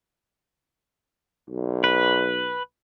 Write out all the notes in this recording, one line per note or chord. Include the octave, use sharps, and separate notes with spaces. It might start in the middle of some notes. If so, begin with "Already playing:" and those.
B1
B4